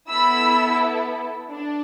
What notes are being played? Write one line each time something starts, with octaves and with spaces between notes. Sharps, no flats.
B3 E4 A4 B5 E6
D4